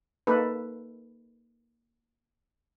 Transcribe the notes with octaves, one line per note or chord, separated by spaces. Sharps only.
A#3 D#4 A4 B4